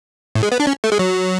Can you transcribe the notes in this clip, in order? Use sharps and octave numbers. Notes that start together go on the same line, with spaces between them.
A2
G#3
B3
D4
C#4
A3
G#3
F#3